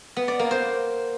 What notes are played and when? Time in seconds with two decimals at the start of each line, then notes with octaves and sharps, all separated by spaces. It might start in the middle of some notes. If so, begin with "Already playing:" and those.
0.16 B3
0.28 D5
0.39 A#3
0.51 C5